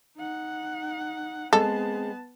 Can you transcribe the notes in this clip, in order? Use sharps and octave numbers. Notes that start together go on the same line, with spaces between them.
D#4 F#5
G#3 B3 C4 A4 A5